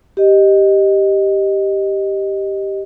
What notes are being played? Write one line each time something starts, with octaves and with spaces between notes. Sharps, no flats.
G4 D#5